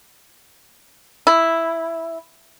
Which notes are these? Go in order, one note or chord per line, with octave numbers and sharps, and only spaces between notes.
E4